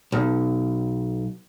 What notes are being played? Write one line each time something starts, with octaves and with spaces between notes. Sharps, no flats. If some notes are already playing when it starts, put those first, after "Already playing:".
B1